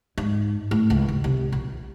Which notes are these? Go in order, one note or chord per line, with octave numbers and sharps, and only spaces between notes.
G#2
A2
C#2
D#2
C2
A#1